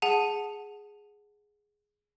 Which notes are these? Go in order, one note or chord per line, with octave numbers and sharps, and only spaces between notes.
G#4 F#5 A5 D#7